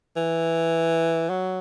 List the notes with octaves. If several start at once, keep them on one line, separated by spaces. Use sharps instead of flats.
E3
F#3